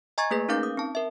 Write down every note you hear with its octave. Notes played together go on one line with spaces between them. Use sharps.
D#5 G#5 A#5 C#6 G#6 A6
A3 A#3 G#4 B4 B6
C#4 D#4 A#4 F5 D6 G6
D#6
C4 A5
A#4 E5